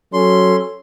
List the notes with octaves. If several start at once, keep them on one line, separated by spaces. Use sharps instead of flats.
F#3 C#4 A4 C6